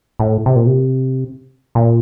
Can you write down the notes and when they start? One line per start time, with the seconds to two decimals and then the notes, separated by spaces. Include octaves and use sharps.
0.20 A2
0.46 C3
0.56 A#2
0.67 C3
1.75 A#2